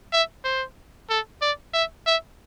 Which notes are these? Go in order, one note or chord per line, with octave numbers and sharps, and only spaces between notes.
E5
C5
A4
D5
E5
E5